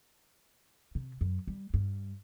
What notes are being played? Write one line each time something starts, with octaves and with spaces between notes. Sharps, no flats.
C3
F#2
G3
G2